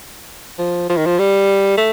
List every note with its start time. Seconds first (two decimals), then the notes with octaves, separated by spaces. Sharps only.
0.59 F3
0.90 F3
0.97 D#3
1.06 F3
1.19 G3
1.78 A3